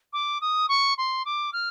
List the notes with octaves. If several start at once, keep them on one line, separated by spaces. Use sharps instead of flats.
D6
D#6
C#6
C6
D6
F6